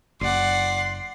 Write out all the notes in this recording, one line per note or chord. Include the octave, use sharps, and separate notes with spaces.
F#1 D5 F#5 C6